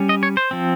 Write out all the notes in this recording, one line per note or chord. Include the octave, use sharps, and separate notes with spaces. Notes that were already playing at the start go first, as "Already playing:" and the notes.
Already playing: G3 C#4
D#5
C#5
C5
F3 C4